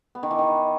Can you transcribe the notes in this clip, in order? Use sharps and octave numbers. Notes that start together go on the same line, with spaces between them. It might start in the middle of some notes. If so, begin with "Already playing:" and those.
B3
D#3
E3
D#3